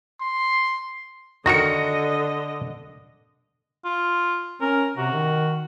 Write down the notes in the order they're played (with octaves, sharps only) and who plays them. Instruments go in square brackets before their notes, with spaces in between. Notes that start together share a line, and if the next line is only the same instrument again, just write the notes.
[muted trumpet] C6
[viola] D3 D#5 [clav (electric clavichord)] D#3 F#4 A#4 [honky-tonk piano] A#6 C#7
[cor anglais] F4
[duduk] C#4 [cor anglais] A#4
[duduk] C3 [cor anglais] F#4
[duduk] D#3